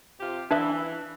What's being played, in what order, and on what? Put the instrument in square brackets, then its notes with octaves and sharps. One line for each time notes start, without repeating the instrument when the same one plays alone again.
[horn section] C3 F4 G4
[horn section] E3 [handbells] D4 B4 E5